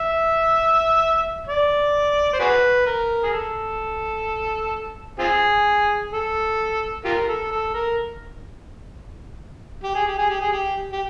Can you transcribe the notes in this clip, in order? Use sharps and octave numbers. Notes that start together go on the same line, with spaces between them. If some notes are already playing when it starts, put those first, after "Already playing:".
Already playing: E5
D5
C5
F#4 G#4 B4
A#4
G#4
A4
C4 F4 G#4
A4
F4 G4 A#4
A4
A4
A#4
G4
G#4
G4
G#4
G4
G#4
G4
G4